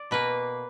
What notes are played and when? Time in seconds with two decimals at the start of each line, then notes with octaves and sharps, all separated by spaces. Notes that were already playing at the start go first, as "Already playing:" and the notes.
Already playing: D5
0.11 B2 A#3 B4